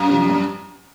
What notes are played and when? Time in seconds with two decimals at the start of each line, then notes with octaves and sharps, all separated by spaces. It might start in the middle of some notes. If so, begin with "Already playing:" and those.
Already playing: F#2
0.09 C3 F3
0.29 G2